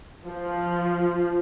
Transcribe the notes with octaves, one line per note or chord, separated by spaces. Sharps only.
F3